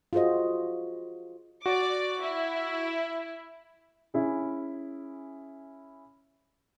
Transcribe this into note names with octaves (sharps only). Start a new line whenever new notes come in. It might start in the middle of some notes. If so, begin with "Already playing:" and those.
F4 F#4 G#4 C5 D#5
F#4 D5 D6
E4
C#4 E4 G#4